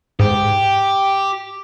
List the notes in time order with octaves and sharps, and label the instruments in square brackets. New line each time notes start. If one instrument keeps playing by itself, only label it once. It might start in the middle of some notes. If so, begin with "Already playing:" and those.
[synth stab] G#2 [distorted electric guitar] G4